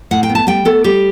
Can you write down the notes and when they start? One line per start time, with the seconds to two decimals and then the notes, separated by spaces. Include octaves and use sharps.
0.11 A2 F#5
0.23 G5
0.29 B3
0.35 A5
0.47 G3 G5
0.65 B3 A4
0.84 G3 G4